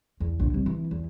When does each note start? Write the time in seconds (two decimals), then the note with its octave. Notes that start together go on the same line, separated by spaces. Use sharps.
0.20 E2
0.39 A#1 D3
0.54 C2
0.66 E3
0.91 E2